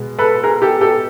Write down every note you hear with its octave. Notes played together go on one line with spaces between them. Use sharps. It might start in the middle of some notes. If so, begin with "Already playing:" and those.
Already playing: B2 G#3 B3
A4 B4
G#4 A#4
G4 A4
G4 A4